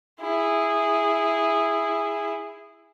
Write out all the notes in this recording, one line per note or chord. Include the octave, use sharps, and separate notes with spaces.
E4 G#4